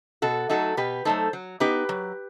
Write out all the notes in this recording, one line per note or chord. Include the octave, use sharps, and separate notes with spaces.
B2 F#4 A4
F#3 A3 D#4 F#4 A4
B2 G4 B4
F#3 A3 D#4 A4 C5
F#3
B3 D#4 G4 B4
F#3